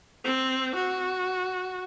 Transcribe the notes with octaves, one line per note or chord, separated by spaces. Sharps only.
C4
F#4